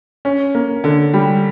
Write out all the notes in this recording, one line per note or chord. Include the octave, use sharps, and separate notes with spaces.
C#4
A#3
D3
G3